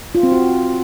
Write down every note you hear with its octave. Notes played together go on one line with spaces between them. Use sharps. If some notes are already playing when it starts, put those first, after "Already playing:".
F4
C4
F#4